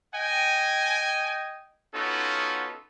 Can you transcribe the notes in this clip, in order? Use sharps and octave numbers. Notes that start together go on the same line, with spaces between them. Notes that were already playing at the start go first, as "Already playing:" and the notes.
D#5 G5 G#5
B3 C#4 D#4 F4 F#4 A4